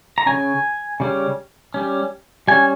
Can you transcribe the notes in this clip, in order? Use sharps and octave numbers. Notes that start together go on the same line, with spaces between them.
A#5
C#3 G3 C#4 G#5
C#3 G3 C#4
G3 C#4
G3 C#4 G#5